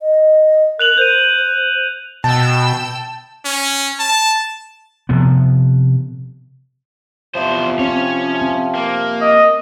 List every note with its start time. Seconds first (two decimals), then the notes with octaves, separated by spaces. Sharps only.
0.01 D#5
0.79 A#4 F#6 F7 F#7
0.98 C5 G6 D#7
2.24 B2 G5 A5 E6
3.45 C#4
4.00 A5
5.09 C3 F3 B3
7.35 E2 C3 F3 C5
7.79 C4 C#4 C#5
8.41 C4
8.75 A#3
9.21 D#5